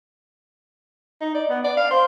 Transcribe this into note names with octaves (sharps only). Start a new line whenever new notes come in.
D#4
D5
B3
D5
F5
C5